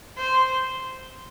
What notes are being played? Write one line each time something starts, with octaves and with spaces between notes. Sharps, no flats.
C5